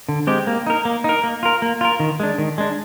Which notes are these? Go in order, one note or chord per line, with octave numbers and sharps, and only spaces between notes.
D3
G#3 C4 G4
A#3
D#4 A#4
A#3
D#4 A#4
A#3
F4 A#4
A#3
F4 A#4
D#3
G#3 D4
D#3
G#3 D4